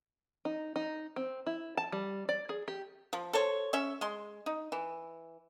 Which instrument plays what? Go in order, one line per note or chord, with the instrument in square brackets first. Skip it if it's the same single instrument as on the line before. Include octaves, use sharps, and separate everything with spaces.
[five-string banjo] D#4
D#4
C4
E4
A5
G3
D5
G#4
G4
[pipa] F3
A4 C5 C#5
C#4 C#5 E5
G#3 C6
D#4
E3